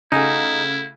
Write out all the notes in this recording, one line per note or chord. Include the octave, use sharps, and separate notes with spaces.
C#3 A3 D#4 E4 F#4 G#5